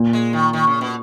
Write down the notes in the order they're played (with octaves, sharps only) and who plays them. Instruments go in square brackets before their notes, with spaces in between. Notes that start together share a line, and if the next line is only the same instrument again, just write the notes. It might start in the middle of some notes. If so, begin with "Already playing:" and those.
Already playing: [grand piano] A#2
[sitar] G#3
D#3
D#3
C#3
B2